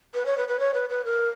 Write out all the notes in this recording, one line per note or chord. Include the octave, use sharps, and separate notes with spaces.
B4
C#5
B4
B4
C#5
B4
B4
A#4